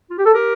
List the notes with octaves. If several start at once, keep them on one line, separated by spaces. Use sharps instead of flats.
F4
G4
A4
G4 A#4